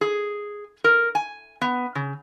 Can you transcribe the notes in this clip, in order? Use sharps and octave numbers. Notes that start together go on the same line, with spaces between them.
G#4
A#4
G#5
B3
C#3